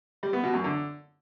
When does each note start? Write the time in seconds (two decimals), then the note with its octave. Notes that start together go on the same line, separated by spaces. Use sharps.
0.23 G3
0.33 B3
0.43 B2
0.54 F#2
0.64 D3